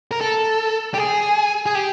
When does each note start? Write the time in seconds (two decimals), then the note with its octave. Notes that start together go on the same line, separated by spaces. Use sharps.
0.11 A#4
0.21 A4
0.94 G4
0.98 G#4
1.66 G#4
1.75 G4